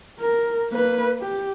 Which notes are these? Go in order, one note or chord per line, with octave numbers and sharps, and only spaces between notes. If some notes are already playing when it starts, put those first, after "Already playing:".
A#4
A#3 B4
G4